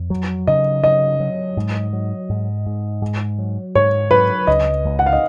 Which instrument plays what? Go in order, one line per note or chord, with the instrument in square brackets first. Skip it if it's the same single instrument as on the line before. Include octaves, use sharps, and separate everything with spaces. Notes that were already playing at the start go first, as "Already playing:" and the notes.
Already playing: [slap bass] F2
F#3
[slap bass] C#3 [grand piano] D#5
[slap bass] F#3 [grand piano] D#5
[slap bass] F#3
G#2
F#3
G#2
G#2
G#2
F#3
[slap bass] G#2 [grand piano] C#5
[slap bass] F#3 [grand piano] B4
[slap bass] C#2 [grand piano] D#5
[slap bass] C#2
[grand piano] F#5
F5
D#5